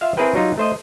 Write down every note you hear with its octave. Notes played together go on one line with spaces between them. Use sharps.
F4 E5 F5
C4 E4 G#4 A#4 B4 G5
F#3 G3 D#4 F4
A3 C5 D#5